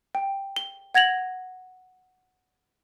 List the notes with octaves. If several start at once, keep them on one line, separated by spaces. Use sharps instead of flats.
G5
G7
F#5 G#6 A#6 F7 F#7